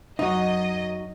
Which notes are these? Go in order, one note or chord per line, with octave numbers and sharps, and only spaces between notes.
F#2 D#4 F#4 D#5